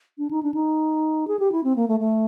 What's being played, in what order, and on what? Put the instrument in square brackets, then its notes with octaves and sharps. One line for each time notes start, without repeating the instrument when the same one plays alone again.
[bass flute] D4
D#4
D4
D#4
G#4
G4
E4
C4
A#3
A3
A3